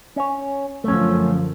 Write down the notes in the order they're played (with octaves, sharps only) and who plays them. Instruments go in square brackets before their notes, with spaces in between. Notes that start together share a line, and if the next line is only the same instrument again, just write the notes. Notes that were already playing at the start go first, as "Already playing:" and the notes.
[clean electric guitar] C#4 C#5
[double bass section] F#2 D3 F3 [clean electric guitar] A3 C#4